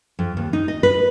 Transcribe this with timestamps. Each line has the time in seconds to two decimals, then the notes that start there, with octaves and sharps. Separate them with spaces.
0.19 F2
0.37 D#2
0.53 D#4
0.68 D#5
0.83 B4